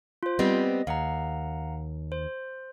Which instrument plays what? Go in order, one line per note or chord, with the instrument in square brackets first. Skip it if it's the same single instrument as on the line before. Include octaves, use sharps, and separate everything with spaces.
[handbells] F4 C5
[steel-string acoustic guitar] G3 B3 C4 [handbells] D#5
[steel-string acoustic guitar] D#2 [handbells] F5 F#5 A#5
[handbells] C5